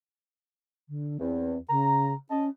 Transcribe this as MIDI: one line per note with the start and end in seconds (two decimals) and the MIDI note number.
0.89 1.18 50
1.20 1.55 40
1.20 1.58 60
1.69 2.14 49
1.69 2.13 82
2.30 2.49 61
2.30 2.46 75
2.30 2.46 81